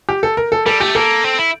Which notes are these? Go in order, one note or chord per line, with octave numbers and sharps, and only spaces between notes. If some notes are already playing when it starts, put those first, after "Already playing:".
G4
A4
A#4
A4
G3 A4
A3 G4
A#3 A4
C4
E4